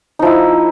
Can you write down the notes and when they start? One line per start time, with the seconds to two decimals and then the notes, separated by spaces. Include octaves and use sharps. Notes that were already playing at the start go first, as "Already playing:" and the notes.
0.19 D#4
0.22 F3
0.25 E4